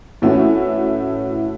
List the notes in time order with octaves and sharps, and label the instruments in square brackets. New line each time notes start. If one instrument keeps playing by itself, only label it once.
[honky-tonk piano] A2 E3 A3 C#4 E4 F#4